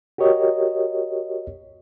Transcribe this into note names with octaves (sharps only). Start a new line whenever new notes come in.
F#4 G4 A#4 C#5 D#5